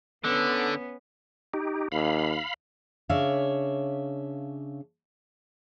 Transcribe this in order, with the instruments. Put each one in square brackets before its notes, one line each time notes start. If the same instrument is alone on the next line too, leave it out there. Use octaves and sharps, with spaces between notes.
[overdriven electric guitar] D3 [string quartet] B3 C#4
[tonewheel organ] D#4 G4
[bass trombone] D#2 [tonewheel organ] F5 B5
[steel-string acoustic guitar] C#3 D4 C#5 E5 F5